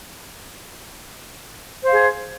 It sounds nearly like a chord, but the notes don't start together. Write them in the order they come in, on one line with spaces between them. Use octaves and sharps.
C5 F5 G#4